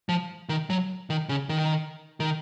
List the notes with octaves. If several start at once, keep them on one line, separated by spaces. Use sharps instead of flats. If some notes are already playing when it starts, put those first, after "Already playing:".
F3
D#3
F#3
D#3
C#3
D#3
D#3